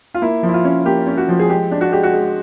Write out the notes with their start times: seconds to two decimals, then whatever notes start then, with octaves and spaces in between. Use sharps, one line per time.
0.14 F4
0.22 A#3 E4
0.43 F3
0.49 E4
0.54 F4
0.64 C#4
0.85 A#3 G4
1.07 C#4
1.17 F#4
1.28 F3
1.39 G#4
1.49 G#3 G4
1.71 D4
1.81 F#4
1.92 G#3 G4
2.03 F#4
2.13 G#3